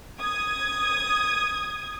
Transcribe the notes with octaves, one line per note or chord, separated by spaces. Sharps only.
D#6 G#6